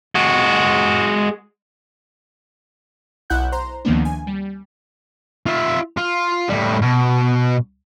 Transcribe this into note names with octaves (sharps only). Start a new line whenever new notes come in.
G#3 F#4
B1 E4 F#5 F#6 G6
C5 A#5 C6
D2 D#3 F3 A#3 B3 D4
G#5
G3
F4 E5
F4
A2 G3
B2